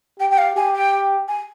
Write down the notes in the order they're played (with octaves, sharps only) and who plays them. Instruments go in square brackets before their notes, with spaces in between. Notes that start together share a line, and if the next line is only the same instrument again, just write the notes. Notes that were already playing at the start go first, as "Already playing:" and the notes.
[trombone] G4 [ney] G5
[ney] G5
F5
[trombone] G4 [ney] G#5
[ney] G5
G#5